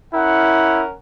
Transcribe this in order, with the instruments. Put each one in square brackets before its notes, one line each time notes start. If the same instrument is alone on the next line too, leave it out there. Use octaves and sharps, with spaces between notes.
[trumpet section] C#4 A#4 F#5 [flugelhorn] E4